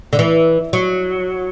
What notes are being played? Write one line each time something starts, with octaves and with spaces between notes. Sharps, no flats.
D3
E3
F#3